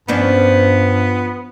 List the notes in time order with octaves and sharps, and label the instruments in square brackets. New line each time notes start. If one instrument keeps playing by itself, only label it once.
[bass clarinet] G2 [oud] F3 C#4 D4 [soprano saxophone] B3